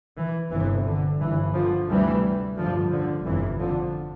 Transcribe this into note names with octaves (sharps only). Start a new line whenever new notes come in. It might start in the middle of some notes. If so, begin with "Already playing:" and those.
E3
G1 F2 C3 E3
D3
G1 G2 E3
D3 F3
D2 C3 E3 G3
A1 G2 D3 F3
D3 F3
G1 F2 C3 E3
D3 F3